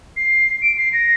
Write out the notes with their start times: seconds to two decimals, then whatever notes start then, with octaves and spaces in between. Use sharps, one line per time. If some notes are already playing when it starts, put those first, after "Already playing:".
0.17 C7
0.62 D7
0.78 C7
0.93 A#6